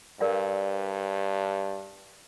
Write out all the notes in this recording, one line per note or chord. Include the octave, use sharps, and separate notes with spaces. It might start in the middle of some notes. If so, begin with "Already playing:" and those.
G2 A#4 D5 F5